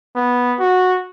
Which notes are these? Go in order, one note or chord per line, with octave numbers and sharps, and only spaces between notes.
B3
F#4